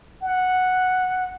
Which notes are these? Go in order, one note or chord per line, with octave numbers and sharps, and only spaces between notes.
F#5